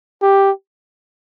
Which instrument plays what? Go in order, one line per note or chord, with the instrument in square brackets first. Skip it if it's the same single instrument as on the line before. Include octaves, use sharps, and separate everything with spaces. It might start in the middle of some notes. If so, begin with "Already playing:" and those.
[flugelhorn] G4